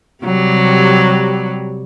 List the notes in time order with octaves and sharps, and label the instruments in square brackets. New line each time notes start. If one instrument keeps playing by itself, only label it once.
[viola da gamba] C3 F#3 G3